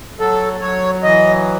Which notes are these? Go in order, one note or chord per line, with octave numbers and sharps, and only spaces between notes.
F#3 A4
F#3 C#5
E3 D#5